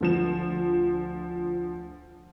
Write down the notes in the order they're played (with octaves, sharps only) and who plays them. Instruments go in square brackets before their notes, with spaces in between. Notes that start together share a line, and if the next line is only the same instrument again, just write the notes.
[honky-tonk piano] D2 F3 E7